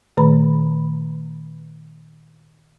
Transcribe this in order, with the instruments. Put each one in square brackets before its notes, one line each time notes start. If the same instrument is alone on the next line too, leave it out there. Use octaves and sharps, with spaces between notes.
[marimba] A#2 D#3 A3 B4 A#5 B5